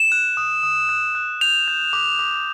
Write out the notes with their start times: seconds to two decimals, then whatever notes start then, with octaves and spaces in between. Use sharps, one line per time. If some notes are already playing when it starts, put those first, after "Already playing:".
Already playing: E7
0.12 F#6
0.37 D#6
0.63 D#6
0.89 F#6
1.15 F#6
1.41 G6 F7
1.68 G6
1.93 D6
2.19 D6